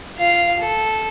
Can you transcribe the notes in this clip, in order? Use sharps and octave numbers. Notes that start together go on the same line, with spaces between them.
F4 F5
A4